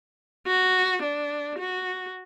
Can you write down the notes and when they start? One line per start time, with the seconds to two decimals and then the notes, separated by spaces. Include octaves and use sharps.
0.47 F#4
1.03 D4
1.59 F#4